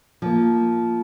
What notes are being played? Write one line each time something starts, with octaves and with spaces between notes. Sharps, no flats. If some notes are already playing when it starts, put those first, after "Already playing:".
F3 A#3